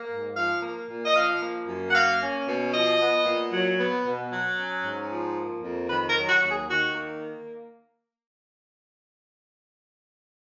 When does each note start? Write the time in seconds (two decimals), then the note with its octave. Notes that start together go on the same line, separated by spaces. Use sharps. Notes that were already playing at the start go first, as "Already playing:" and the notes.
Already playing: A#3
0.10 G#2
0.36 F3 F5
0.62 A#3
0.89 A#2
1.05 D#5
1.15 F3 F5
1.41 A#3
1.68 F#2
1.90 F#5
1.94 A#3 F5
2.21 C#4
2.47 B2
2.73 F3 D#5
2.99 B3
3.26 A#2
3.52 F#3
3.79 B3
4.05 B2
4.32 F#3
4.57 C#4
4.85 G#2
5.11 F3
5.37 A#3
5.63 F2
5.90 D#3 B4
6.09 A#4
6.16 F#3
6.29 F#4
6.43 D#2
6.50 G#4
6.69 D#3 F#4
6.95 A#3